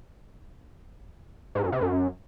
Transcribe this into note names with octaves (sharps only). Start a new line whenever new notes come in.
G#2
F#2
C3
F#2